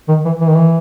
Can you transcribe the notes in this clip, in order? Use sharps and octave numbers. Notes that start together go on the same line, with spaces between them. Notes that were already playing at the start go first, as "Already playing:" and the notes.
D#3
E3
E3
D#3
E3